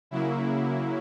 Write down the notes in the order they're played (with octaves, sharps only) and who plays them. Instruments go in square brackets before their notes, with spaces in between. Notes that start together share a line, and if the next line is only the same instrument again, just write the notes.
[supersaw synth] C#3 F#3 A#3 E4